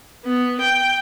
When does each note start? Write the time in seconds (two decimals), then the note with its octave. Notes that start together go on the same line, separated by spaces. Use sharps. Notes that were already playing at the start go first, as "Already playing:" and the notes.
0.25 B3
0.61 G5